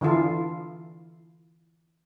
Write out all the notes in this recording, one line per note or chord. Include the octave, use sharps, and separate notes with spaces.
D3 E3 E4 F4 A4